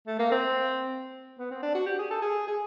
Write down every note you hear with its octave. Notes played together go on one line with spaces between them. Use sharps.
A3
A#3
C4
B3
C4
D4
F#4
G4
G#4
A4
G#4
G#4